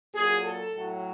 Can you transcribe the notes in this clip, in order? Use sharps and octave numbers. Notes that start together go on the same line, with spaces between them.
A#2 F#3 G#4
A4
A2 F#3